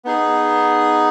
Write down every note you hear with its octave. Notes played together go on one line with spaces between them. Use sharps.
B3 D#4 G#4